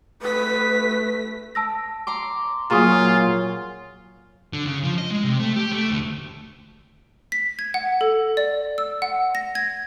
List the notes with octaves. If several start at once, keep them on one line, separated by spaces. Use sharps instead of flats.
A3 B4 B6
A5 E6 A#6
A#5 C6 D6
A#2 F#3 F4 G#4 G#5 A#5 C#6 D#6
D3
C#3
F3
D#5
G#3
C3
A3
G4
A3
D2
B6
G#6
F#5
A4
D5
E6
F#5
A#6
G#6